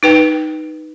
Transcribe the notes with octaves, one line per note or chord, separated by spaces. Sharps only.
D#4 B4 G5